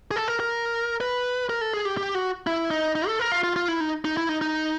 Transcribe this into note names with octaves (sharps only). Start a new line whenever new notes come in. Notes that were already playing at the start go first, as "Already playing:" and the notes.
G#4
A4
A#4
A#4
B4
A#4
A4
G#4
G4
G4
F#4
E4
D#4
D#4
A4
A#4
F4
F4
F4
E4
D#4
D#4
E4
D#4
D#4